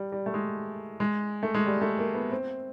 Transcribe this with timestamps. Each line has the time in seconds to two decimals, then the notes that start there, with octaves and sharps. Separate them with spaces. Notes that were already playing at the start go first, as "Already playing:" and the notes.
Already playing: G3
0.12 G3
0.26 A3
0.34 G#3
1.00 G#3
1.43 A3
1.55 G#3
1.66 G3
1.81 A3
1.99 A#3
2.15 B3
2.32 C4